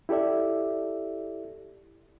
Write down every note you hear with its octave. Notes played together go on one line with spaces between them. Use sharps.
E4 G4 A4 D5 E5